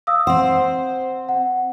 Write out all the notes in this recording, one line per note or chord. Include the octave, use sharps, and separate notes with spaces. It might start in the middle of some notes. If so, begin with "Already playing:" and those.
F5 D#6 E6
C4 C5 F#5
F#5